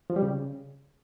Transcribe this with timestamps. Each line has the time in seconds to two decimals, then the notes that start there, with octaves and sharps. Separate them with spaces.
0.10 F3
0.16 G3
0.23 C#3